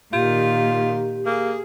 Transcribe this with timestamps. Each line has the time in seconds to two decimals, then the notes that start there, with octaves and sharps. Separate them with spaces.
0.13 A#2 D#3 F4 G4
1.26 A#3 G#4